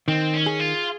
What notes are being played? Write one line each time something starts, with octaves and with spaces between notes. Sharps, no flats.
D#3 C4
C#4
G#4
F4